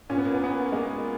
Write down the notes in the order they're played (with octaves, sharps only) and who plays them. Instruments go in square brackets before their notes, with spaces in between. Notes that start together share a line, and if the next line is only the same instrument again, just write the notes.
[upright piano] A#2 C#4
B3
A#3
B3
B3
G#3
A#3